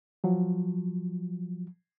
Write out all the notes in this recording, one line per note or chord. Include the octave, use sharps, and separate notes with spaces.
F3 F#3